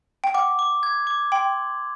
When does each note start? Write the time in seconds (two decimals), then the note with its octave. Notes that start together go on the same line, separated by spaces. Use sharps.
0.24 G5
0.34 F#5 D6
0.59 D6
0.83 G#6
1.07 D6
1.32 G5 C6